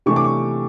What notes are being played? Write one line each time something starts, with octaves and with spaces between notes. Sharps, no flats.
C3 E3 A3 D4 C#6
D6
C#6